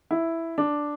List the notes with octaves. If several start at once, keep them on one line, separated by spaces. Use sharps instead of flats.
E4
D4